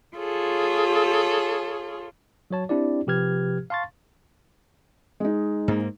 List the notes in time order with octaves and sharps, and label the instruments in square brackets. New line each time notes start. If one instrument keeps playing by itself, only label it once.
[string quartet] F4 G#4 A4 C#5
[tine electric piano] F#3 F#4 C#5 A5
C4 D4 E4 G4 D5
C3 F3 G4 B4 F6 G#6
F5 A5 C6 C#6 A6
[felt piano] G#3 D#4
[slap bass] G#2 A#3